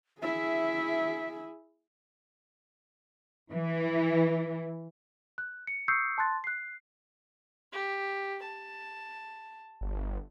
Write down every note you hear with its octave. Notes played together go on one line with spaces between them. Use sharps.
E4 G#4 E5
E3
F#6
C#7
C#6 D#6 E6 G6 C7 C#7
A5 C6 F#6 A6
F#6 C7
G4
A5
G1